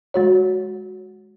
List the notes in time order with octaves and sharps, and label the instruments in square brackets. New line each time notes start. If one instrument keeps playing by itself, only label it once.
[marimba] G#3 F#4 C#5